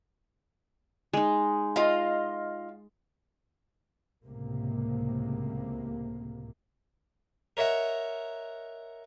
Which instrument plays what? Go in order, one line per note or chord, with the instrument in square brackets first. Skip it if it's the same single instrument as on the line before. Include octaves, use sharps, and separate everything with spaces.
[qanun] G#3 D#4
[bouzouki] F4 D#5 F5
[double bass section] C#2 A2 C3 A#3
[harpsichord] A#4 C#5 D#5 E5 F#5